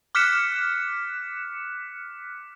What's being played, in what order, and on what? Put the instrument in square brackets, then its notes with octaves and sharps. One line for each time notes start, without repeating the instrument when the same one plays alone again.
[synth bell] D6 F6 F#6 B6 C#7 E7